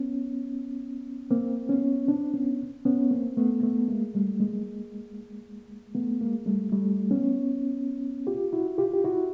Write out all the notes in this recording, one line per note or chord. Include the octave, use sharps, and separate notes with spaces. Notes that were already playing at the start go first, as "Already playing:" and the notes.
Already playing: B3 C#4
A#3 C4
B3 C#4
C4 D4
B3 C#4
B3 C#4
A#3 C4
A3 B3
A3 B3
G#3 A#3
G3 A3
G#3 A#3
A3 B3
G#3 A#3
G3 A3
G3 A3
B3 C#4
F4 G4
E4 F#4
F4 G4
G4
E4 F#4